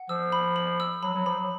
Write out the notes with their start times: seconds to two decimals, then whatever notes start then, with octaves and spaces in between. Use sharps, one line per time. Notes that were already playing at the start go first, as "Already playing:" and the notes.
Already playing: F#5
0.09 F3 E6
0.32 B5
0.56 B5
0.80 E6
1.03 F#3 B5
1.15 F#3
1.26 F3 B5
1.38 F#3